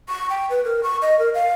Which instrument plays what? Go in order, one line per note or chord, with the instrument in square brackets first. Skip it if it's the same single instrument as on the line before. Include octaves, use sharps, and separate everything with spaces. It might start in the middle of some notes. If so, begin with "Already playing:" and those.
[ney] C#6
G5
B4
A#4
C#6
D#5
A#4
F5